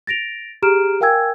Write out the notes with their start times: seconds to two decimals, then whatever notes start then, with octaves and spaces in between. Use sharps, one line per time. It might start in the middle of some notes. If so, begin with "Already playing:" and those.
0.07 A6 A#6 D7 F7
0.62 G4 G#4 A#5 F6 D7 E7
1.01 A#4 F5 G5 G#5 E6 G#6